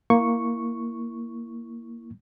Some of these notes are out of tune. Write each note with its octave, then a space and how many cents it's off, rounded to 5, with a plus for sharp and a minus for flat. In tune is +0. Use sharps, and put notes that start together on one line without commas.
A#3 +0 E4 +0 C#6 +0